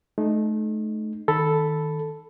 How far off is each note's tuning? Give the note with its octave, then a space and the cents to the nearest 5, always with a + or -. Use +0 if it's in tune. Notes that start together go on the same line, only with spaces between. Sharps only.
A3 -30 D#4 -20
D#3 +0 A4 +0 B5 +0